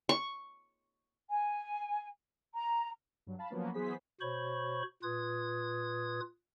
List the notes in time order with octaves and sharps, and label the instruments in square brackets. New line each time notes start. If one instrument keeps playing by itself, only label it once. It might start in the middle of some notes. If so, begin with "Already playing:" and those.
[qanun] C#6
[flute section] G#5
A#5
[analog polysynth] G2 F#3
F5 A5 B5
F3 F#3 A#3 B3 C#4
E3 F#3 B3 G#4 C5 B6
[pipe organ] B2 F#4 C5 C#5 B5 C#6
A#2 F4 B4 D#6 G#6